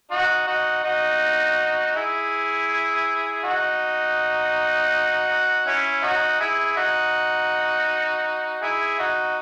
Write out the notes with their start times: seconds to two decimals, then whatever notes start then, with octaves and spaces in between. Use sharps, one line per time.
0.10 D#4 F#4
0.47 D#4 F#4
0.84 D#4 F#4
1.96 E4 G#4
3.43 D#4 F#4
5.66 C#4 E4
6.03 D#4 F#4
6.40 E4 G#4
6.76 D#4 F#4
8.62 E4 G#4
8.99 D#4 F#4